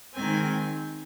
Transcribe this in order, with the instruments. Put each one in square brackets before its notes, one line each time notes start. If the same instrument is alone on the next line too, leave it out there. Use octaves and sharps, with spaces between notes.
[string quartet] D#3 G#3 C4 G#5